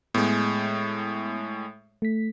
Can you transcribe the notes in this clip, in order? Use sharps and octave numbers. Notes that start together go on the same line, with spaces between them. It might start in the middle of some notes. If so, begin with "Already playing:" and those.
A2 G#3 B3 G6
A3 B6